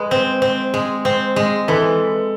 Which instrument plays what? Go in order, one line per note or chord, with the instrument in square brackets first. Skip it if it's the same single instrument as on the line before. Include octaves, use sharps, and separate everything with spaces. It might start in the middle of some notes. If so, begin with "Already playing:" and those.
Already playing: [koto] G#3 [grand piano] B4
[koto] C4
C4
G#3
C4
G#3
[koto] E3 [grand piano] A4 B4